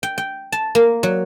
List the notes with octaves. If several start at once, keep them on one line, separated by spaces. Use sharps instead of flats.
G5
G5
A5
A#3
F#3